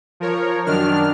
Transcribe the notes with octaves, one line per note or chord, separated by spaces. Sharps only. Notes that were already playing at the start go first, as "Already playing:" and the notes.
F3 A#4 C#5
F#2 D#3 D4 F6